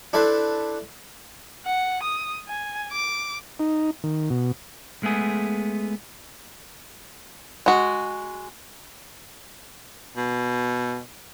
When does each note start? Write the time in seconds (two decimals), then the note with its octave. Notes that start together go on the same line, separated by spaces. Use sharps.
0.13 D4 E4 A4 B4 C5
1.66 F#5
2.03 D#6
2.48 G#5
2.92 D6
3.60 D#4
4.04 D#3
4.30 B2
5.03 G#3 A3 B3 G#4
7.66 G#3 F#4
10.16 B2